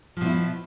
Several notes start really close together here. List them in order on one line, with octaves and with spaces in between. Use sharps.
F3 B2 E4